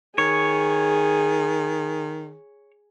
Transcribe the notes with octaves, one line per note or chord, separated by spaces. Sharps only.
D#3 G#4 C#5